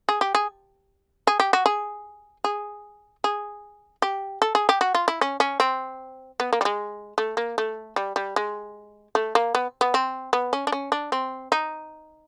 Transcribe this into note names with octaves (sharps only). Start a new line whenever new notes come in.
G#4
G4
G#4
G#4
G4
F#4
G#4
G#4
G#4
G4
A4
G#4
G4
F#4
F4
E4
C#4
C#4
C4
B3
A#3
G3
G#3
A3
A#3
A3
G3
G3
G#3
A3
A#3
B3
B3
C4
B3
C#4
D4
C#4
D4
C4
D#4